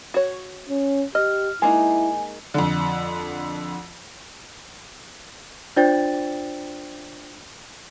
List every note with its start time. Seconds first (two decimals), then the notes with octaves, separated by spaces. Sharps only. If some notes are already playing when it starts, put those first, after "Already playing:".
0.14 F#4 C#5
0.69 C#4
1.15 G4 D#5 F6
1.62 G#3 A#3 D#4 E4 G#5
2.54 F2 D3
5.76 D4 F4 C5 D5 G5 A6